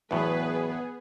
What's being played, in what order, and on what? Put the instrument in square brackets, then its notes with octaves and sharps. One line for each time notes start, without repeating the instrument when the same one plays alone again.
[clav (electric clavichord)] E2 A2 [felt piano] E3 F#3 [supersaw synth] B3 G#4 [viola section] B4